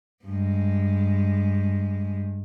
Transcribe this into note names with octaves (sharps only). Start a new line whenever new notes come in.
G2 G#3